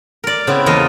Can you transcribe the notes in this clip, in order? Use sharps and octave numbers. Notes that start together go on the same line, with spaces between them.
A#4 D5
C#3 B3 C4 E4
E2 A#3 F4 D#5 A5